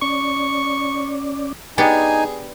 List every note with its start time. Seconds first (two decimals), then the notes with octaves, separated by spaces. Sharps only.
0.02 C#4 D5 C#6
1.78 B3 D4 D#4 G4 G#4 G#5